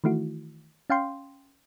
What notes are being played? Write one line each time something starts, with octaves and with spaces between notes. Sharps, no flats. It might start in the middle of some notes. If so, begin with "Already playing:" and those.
D#3 E3 A3 E4 F#4
C#4 F5 G5 C6